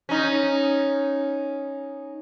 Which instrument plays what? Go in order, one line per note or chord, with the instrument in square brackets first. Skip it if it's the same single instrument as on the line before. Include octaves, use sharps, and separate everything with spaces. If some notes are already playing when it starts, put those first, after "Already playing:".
[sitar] C#4 D#4